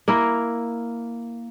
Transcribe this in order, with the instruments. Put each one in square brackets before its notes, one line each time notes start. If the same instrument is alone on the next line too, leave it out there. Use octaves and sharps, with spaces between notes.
[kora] A#3 E4 A#4